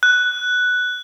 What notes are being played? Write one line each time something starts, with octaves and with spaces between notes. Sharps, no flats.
F#6